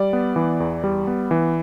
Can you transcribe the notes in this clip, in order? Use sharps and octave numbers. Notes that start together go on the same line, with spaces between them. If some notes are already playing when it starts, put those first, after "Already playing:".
Already playing: G3 D5
B3
E3
E2
G3
B3
E3